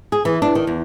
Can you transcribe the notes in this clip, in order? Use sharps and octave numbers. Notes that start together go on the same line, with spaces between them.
G#4
E3
D4
D#3
E2